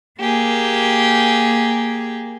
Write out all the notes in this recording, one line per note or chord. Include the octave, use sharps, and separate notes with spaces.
A#3 G4 G#4